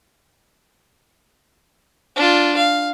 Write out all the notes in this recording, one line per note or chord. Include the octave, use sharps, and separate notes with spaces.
D4 F4
F5